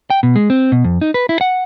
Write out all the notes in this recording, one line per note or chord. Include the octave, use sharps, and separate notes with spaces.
G5
B2
G#3
C4
B2
F2
D#4
B4
E4
F#5